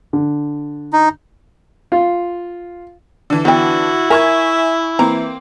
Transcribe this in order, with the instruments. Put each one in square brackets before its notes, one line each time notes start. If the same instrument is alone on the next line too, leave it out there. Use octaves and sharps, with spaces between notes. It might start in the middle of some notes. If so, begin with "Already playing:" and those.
[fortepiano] D3
[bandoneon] D#4
[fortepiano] F4
[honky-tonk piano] D3 E3
[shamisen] B3 G5 [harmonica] E4 [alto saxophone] F#4
[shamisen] A#4 [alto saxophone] E5 [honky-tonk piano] G#5 C#6 G#6
[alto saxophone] E3 [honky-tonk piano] A#3 C4 [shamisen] A#5